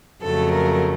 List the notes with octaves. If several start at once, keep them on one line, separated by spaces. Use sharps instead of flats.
F2 C#3 F#3 A3 A4
A#4